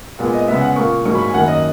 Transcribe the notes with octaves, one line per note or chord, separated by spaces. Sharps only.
A#2 G#3 B3
D#5
C#3 G#3 B3 E5
F#5
A#2 A#3 C#6
G#2 F#3 A#3 C#6
B5
G#5
F#2 D#3 A#3 F#5
D#5